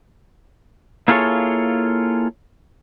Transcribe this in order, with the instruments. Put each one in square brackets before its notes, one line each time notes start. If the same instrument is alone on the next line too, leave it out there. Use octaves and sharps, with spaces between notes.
[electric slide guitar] A#3 E4 F4 G#4 A4 C#5